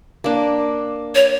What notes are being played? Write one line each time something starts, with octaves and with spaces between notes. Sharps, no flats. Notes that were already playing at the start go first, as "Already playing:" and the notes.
A#3 D4
C#5